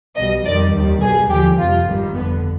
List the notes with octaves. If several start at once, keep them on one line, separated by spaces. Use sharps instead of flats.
B1 B2 G3 D#5
F2 D#3 G3 D5
D#2 D#3 G3
B1 B2 G3 G#4
D#2 D3 F3 G4
F2 C3 G3 F4
G#1 G2 D#3 G3
G1 F2 D3 B3